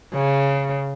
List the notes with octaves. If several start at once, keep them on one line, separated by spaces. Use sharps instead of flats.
C#3